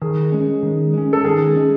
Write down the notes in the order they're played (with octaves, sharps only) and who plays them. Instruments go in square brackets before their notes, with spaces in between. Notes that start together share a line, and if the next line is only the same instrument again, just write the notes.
[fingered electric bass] D#3 [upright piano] G#4
[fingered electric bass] G#3 C#4
D#3
G#3 C#4
[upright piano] A4
[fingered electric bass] D#3 [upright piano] G#4
[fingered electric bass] G#3 C#4